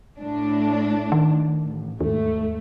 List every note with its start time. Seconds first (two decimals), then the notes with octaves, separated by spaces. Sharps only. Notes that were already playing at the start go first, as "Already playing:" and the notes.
0.20 A2 D4
1.12 D#3
1.63 A1
2.01 D#2 G#2 A3